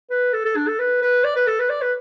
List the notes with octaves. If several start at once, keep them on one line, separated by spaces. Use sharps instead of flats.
B4
A4
A4
D4
A4
B4
B4
D5
B4
A4
B4
D5
B4